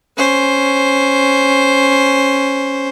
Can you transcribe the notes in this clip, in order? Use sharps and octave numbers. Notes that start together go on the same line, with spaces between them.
C#4 C5